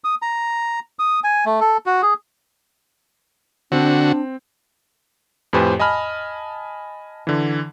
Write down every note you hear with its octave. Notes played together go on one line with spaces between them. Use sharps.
D#6
A#5
D#6
G#5
A3
A4
F#4
G#4
D3 C4 D4 F#4
F2 A2 G4 B4 C5 G#5
D#5 G#5 A5 B5 F6
D3 E3